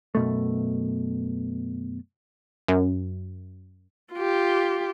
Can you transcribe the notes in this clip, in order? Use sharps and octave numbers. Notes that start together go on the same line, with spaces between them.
F#2 B2 A3
F#2
F4 G4